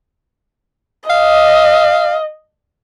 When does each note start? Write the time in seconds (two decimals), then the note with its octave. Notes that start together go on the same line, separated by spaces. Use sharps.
1.10 D#5 F5